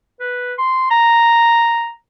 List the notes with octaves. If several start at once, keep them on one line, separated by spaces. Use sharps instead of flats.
B4
C6
A#5